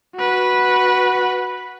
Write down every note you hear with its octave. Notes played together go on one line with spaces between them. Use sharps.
F#4 B4